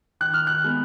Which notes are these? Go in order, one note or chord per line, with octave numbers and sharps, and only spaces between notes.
D#3 F#6
F6
F#6
G#3 B3